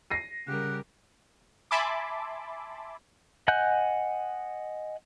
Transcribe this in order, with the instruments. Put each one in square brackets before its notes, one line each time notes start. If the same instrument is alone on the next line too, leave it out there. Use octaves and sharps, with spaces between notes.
[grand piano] A#6 C7 D#7
[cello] C#3 G3 [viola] G4 A#4 [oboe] F#5
[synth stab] E5 G#5 A5 B5 C6 D6
[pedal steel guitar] D#5 F#5 G#5 F#6 G6